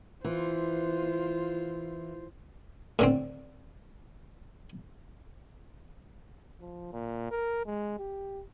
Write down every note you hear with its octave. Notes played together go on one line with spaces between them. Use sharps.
E3 F4 C5
A2 D3 C4
F3
A#2
A#4
G#3
G4